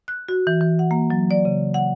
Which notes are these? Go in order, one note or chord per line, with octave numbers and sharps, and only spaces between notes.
F#6
F#4
E3
E3
F#5
A#3
F#3
D5
C#3
F#5